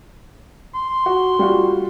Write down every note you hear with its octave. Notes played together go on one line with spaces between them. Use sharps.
C6
F#4
G3 F4 F#4